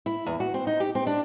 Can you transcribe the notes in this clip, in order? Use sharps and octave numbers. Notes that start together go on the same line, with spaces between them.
E4
E2
F#4
C4
D#4
G4
C4
D4